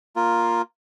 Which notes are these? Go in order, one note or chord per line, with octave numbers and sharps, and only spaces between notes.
A#3 F4